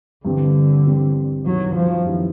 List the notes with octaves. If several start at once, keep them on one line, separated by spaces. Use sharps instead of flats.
G2 D3 E3 G3 C4
G2 E3 G3 C4
F#2 D#3 F#3 G3 B3 E4
F3
F#2 D#3 G3 B3 E4